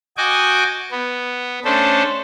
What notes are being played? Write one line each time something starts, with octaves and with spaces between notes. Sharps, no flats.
F#4 D#5 G5 G#5 D6
B3
A3 C#4 D4 A4 C5